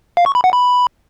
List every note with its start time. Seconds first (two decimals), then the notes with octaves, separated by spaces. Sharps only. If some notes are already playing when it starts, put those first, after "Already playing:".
0.17 F5
0.26 C#6
0.35 B5
0.44 F#5
0.53 B5